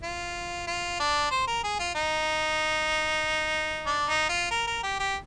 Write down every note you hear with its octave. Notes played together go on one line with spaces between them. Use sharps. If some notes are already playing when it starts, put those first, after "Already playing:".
F4
F4
D4
C5
A#4
G#4
F4
D#4
D4
D#4
F4
A#4
A#4
G4
G4